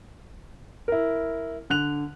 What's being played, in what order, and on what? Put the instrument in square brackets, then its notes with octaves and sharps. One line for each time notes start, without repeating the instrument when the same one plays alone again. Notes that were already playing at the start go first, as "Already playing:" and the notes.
[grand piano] E4 A#4
D3 F#6 F7